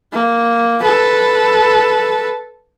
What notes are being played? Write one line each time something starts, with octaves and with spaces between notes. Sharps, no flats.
A#3
A4 B4